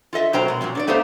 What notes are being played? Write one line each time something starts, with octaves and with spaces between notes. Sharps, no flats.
F4 A4 D#5 E5
B2 F#3 A#4 C5 G5 A#5
B2 G#3
A#2 F3 F#3 C4
D4 C#5 D5
A3 B3 D#4 G4 C5 F5